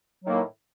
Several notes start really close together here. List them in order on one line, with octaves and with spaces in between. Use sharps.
F#3 D#3 A#3 A2